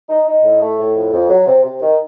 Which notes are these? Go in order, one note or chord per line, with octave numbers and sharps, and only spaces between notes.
D#4
D#4
A2
A3
A2
F2
F2
F#3
C3
C3
D#3